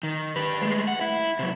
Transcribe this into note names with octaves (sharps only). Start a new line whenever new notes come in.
D#3
G4 B4
G#3 A3
F#5
E4
C3 F#3